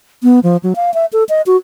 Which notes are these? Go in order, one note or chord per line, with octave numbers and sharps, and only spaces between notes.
B3
F3
F#3
F5
E5
A4
D#5
F#4